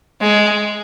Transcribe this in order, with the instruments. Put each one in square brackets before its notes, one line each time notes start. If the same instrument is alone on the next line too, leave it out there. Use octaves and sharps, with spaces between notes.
[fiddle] G#3